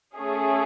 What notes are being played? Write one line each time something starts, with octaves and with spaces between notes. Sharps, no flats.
A3 C#4 G#4